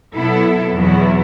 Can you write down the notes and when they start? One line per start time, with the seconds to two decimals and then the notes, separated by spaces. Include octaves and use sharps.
0.15 B2 F#3 B3 E4 A4
0.75 E2 B2 F#3 B3 E4